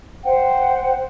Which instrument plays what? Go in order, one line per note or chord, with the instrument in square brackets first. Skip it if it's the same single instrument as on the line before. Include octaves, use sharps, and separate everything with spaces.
[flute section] C5 F#5 G5